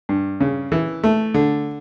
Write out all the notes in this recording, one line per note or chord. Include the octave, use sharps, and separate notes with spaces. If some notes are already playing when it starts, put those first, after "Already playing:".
G2
C#3
E3
A3
D3